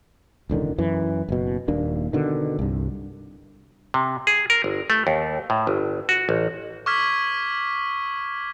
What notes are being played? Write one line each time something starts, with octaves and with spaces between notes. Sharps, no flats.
E1 C#2 D3 D#3
F#2 E3
F#1 B2
D#1 D#2 A#3 D4
B2 D3 D#3
C2 G2
C3
G#4
A#4
G1
A3
D#2
A2
G1
F#4
A1
C#6 D6 E6 F6 G#6 B6